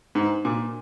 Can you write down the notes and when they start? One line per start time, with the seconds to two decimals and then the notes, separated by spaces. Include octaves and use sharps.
0.15 G#2
0.45 A#2